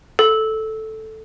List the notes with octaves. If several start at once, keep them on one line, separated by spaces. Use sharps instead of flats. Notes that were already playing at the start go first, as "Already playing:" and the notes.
A4